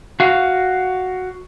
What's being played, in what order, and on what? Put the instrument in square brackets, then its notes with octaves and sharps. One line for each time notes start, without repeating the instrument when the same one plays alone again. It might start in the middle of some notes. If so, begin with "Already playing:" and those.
[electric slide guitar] F#4 F5